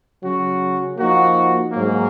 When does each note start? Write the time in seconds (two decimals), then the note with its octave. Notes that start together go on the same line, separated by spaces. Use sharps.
0.23 C#3 F#3 C#4 F#4
0.97 F3 A#3 D#4 F#4
1.71 G#2 F#3 A#3